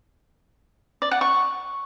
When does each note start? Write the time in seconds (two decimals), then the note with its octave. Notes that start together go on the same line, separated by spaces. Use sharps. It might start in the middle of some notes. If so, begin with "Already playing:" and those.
1.02 D5
1.11 F#5
1.21 C#6